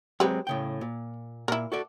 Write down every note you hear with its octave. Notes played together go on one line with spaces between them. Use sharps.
F#3 G#3 C4 G4 B4
A2 C#3 G5
A#2
A#2 E4 A#4
F#4 A4 D5